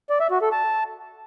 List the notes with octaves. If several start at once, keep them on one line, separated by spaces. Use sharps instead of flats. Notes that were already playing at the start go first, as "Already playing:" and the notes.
D5
E5
F#4
A4
A5